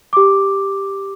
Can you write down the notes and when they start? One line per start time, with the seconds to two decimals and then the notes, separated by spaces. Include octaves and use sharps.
0.13 G4 D6